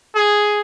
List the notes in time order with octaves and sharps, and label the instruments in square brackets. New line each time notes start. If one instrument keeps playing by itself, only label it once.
[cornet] G#4